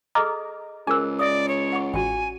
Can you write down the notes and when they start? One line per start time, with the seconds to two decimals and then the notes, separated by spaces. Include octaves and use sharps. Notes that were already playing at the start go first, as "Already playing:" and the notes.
0.15 G#4 A4 D#5 A#5 D6 F6
0.87 C#2 G#4 A#4 C5 G#5 E6
1.19 D5 E5 D#6
1.48 C#5
1.72 F#5 C#6
1.94 A1 F#4 G5 G#5